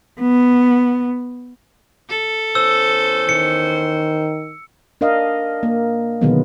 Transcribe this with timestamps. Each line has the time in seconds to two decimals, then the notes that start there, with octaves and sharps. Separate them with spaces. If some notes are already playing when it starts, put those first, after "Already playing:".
0.21 B3
2.09 A4
2.55 E2 C#4 C5 E6
3.29 D#3 C#7
5.01 D4 A#4 D#5 F5
5.63 A#3
6.21 B2 D3 D#3 F#3 G#3 B3